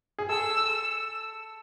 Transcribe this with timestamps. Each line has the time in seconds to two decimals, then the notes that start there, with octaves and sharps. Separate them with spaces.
0.19 G#4
0.29 A4 E6